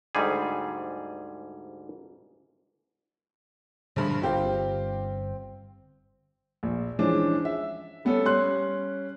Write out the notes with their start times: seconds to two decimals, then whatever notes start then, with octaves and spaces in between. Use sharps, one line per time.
0.15 D2 G#2 G3 G#4
3.96 A#1 G2 D3 G3 G#3 B5
4.22 G1 G2 C4 F4 G4 F5 G5
6.63 A#1
6.99 E3 F3 G#3 C#4 D4
7.45 E5
8.05 G3 B3 C#4 A4
8.25 G3 C#4 C6 F#6